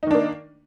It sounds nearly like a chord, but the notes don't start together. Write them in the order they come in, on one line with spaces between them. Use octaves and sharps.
D#4 D#3 D4 A#3